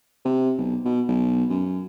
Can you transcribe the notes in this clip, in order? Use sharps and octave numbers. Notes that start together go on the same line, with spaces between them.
C3
B1
B2
B1
F#2